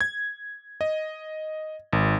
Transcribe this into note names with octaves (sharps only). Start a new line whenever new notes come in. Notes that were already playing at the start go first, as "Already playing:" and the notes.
G#6
D#5
G#1